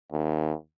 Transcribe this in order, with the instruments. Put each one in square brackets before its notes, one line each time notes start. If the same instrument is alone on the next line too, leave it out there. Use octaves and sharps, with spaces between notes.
[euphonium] D#2